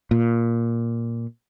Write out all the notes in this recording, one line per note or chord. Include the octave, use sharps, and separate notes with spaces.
A#2